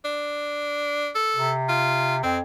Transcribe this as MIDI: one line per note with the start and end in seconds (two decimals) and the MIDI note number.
0.05 1.10 62
1.15 1.52 69
1.36 2.22 48
1.69 2.16 65
2.23 2.41 41
2.23 2.37 60